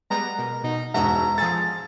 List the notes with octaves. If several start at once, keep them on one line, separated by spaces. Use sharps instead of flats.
G3 G#3 B3 A#5
B2 A#4
B2 D#4
E1 G#2 F#4 D#5 E5 A#5
F3 G#4 A4 A6